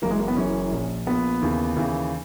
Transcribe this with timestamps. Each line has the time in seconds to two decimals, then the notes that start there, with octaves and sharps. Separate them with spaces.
0.02 F#1 F#2 E3 A#3
0.11 G#3
0.19 A#3
0.28 B3
0.37 F#1 F#2 E3 C#4
0.71 A#1 A#2
1.07 A#1 A#2 B3
1.42 D#2 C#3 E3
1.76 D#2 C#3 E3